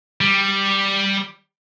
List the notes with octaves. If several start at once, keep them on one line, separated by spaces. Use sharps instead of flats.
G3